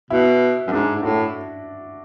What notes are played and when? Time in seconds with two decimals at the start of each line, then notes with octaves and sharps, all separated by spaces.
0.10 B2 E4
0.67 F#2
0.72 G#2 D4
0.96 G#2
1.03 A2 F#4